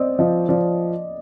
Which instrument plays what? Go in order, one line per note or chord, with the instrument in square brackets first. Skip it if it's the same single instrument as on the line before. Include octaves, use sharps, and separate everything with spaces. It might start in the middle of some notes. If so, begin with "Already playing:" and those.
Already playing: [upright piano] C4 [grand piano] D5 D#5
[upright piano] F3 [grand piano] D#5
[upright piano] F3 [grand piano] D5